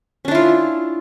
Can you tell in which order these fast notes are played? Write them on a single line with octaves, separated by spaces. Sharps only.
C#4 D4 E4 F4